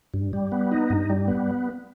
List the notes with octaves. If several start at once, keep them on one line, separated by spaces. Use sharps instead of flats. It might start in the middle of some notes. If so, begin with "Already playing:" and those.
G2
G3
B3
D#4
G2
G3
B3